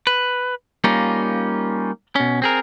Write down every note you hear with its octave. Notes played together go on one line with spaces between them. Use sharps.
B4
G3 A#3 C#4 D#4 F4
B2 C#4
C4 G#4 A#4